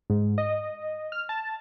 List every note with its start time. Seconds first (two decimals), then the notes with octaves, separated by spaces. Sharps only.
0.10 G#2
0.38 D#5
1.12 F6
1.29 A5